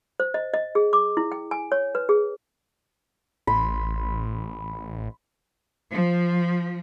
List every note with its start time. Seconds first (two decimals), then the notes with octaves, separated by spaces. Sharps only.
0.20 C5
0.34 D#5
0.54 D#5
0.75 G#4
0.93 D6
1.17 E4
1.32 G5
1.51 G#5
1.72 C#5
1.95 B4
2.09 G#4
3.47 A1 B5 C6
5.92 F3